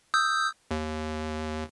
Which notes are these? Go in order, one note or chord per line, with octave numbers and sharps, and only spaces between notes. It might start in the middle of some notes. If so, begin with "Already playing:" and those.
D#6 E6 G6
D#2